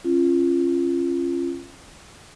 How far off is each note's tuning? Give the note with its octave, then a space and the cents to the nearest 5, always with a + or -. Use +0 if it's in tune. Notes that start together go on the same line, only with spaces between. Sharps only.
C#4 -25 F4 -20